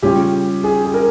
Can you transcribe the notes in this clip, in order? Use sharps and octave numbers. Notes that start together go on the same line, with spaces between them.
C#3 G3 C#4 F4 G4
G#4
G#4
A#4